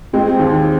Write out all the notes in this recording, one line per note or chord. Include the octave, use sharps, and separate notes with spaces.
G#3 C4
D#2